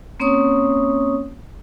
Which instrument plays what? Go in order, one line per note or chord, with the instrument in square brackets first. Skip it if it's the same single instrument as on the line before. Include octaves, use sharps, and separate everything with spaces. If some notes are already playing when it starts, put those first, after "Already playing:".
[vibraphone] A#3 C4 C#4 C#5 C#6 D#6